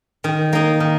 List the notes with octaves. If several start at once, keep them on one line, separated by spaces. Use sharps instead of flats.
D#3
A#3 D#4
D#3